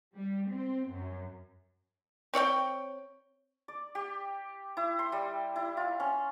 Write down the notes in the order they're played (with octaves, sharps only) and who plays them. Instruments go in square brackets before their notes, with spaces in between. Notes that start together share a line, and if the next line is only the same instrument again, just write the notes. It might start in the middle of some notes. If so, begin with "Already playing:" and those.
[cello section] G3
C4
F#2
[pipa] C4 C#5 D5 G5
[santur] D5
G4
E4
C6
G3
E4
F4
C#4